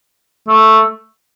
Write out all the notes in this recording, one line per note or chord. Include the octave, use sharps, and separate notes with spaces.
A3